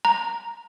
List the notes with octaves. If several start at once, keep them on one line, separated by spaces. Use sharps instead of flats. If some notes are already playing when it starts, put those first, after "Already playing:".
A#5